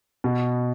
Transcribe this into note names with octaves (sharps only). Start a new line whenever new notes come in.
B2